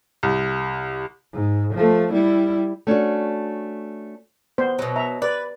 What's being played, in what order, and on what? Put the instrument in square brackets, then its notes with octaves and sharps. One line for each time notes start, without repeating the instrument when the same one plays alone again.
[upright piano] C2
[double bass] G#2
F3 A3
G3 E4
[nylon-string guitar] A3 C#4 D4 F#4
[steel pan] B3 C5
[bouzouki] B2 F#3
[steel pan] E5 A#5
[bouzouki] B4 [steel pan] D5